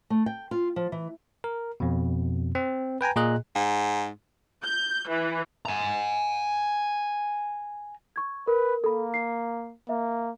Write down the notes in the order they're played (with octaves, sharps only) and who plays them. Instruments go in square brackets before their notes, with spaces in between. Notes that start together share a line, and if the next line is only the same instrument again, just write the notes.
[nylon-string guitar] A3
G5
F4
F3
E3
[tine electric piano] A#4
F2 B2
C4
B4 G5 G#5 A#5
A#2 G#4 D#5 F#6
[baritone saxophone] G#2
[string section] G6
E3
[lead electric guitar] G#5 A#5
[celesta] C#6 G#6
[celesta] A#4 [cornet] B4
[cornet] A#3 [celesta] A4 B5
[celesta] C7
[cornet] A#3 [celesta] E5